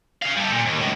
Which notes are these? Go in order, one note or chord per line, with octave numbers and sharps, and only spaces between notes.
G#4 F5
G3 A4
A#2
D#2
C#2 A2